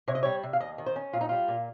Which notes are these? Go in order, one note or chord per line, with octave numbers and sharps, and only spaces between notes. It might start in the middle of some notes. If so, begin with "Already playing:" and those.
C3 C#5
D#5
G3 C#5
C3
F5
D#2 D#5
D#3
C5
C#4
A#2 F4
D#4
G3 F4
A#2